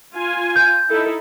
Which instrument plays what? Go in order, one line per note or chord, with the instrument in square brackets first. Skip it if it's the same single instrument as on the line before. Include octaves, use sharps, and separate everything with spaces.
[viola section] F4 G#5
[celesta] G6
[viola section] D#4 E4 A4